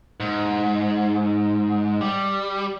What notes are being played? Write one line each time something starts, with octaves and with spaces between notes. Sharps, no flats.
G#2
G3